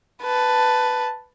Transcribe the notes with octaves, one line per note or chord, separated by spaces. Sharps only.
B4 A5